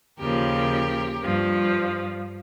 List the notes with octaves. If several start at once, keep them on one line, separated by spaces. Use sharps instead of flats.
D#2 C#3 F3 G4 A#4
G2 F3